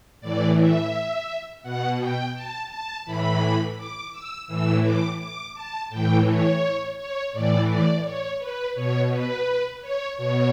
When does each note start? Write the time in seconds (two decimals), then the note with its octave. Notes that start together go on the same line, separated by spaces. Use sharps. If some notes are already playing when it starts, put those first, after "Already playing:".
0.21 A2 E3 D5
0.57 E5
1.63 B2 F#5
1.99 G5
2.34 A5
2.70 A5
3.05 A2 E3 B5
3.77 D6
4.12 E6
4.48 A2 E3 E6
4.83 D6
5.19 D6
5.54 A5
5.90 A2 E3 G5
6.26 C#5
6.97 C#5
7.33 A2 E3 D5
7.68 D5
8.04 C#5
8.39 B4
8.75 B2 C#5
9.10 B4
9.81 C#5
10.17 B2 C#5